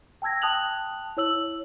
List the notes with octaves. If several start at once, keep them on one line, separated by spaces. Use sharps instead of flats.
G5 A5 E6 G#6 A#6
G5 A5 D#6 F#6 F7 F#7
E4 C#5 E6 F#7